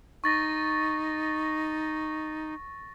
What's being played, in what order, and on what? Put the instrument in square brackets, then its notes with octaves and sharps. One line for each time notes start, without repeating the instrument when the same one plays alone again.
[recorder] D#4 [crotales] C#6 A6 A#6